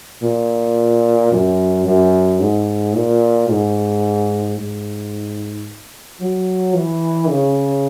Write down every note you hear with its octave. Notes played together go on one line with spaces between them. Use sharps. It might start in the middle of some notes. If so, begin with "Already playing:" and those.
A#2
F#2
F#2
G#2
A#2
G#2
G#2
F#3
E3
C#3